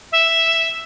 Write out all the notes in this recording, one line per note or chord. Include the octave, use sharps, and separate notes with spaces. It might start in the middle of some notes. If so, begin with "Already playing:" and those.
E5